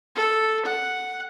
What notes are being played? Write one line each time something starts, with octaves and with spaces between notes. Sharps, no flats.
A4
F#5